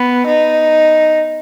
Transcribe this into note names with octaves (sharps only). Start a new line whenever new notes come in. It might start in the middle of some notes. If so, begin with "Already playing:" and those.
Already playing: B3
D#4